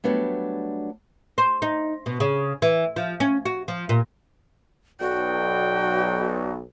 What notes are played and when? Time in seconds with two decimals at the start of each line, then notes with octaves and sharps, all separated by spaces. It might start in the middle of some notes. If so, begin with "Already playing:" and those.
0.04 F#3 G3 A3 B3 D4
1.38 C5
1.62 D#4
2.06 B2
2.20 C#3
2.62 E3
2.96 F3
3.20 C#4
3.46 F#4
3.68 F3
3.89 A#2
5.00 B1 F#4 D5 G5